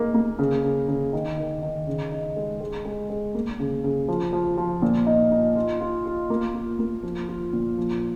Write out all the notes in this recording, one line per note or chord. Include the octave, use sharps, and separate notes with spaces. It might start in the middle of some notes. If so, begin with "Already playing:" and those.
Already playing: G#3 A#3 D#4
A#3
C#3
C#3
C#3
D#3
D#3
D#3
C#3
D#4
G#3
G#3
G#3
G#3
A#3
C#3
C#3
F3
F3
F3
A#2
D#4
D#4
F4
F4
F4
A#3
F4
A#3
F3
F4
A#2
F3